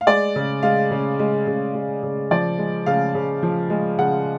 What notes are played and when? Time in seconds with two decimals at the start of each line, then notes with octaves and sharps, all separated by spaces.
0.01 F5
0.07 G#3 D5
0.36 C#3
0.63 G#3 F5
0.91 C#3
1.19 G#3
1.47 C#3
1.75 G#3
2.03 C#3
2.31 F3 D5
2.58 G#3
2.86 C#3 F5
3.15 C#3
3.43 F3
3.70 G#3
3.98 C#3 F#5